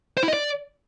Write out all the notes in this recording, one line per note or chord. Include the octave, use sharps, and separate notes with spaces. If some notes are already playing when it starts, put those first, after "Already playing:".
C5
E4
D#5
D5